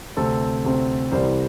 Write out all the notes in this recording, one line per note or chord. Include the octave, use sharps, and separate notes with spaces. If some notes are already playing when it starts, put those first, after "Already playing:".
D2 C3 A3 C4 A4
D2 C3 A3 C4
C2 C3 E3 G3 C5